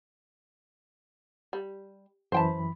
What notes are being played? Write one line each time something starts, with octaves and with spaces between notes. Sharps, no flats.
G3
F#2 E3 C5 G5 A5 B5